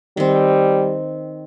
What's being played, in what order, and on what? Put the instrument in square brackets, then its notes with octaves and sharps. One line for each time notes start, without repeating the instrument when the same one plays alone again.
[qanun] D#3 C4 [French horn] G3